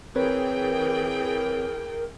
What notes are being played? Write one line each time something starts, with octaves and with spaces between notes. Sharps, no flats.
E3 C4 G#4 A#4 B4 C#5 G5